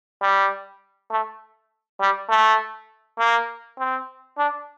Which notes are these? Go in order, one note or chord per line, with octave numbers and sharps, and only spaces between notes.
G3
A3
G3
A3
A#3
C4
D4